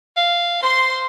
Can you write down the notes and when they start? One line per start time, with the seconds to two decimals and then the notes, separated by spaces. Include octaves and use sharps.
0.17 F5
0.63 C5 C6